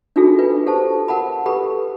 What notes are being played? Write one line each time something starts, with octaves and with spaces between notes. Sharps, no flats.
D4 D#4 F4 F#4 G#4 A4
D4 F4 B4
G4 A4 C5 A5
A#4 F#5 A5 B5
G4 A4 B4 B5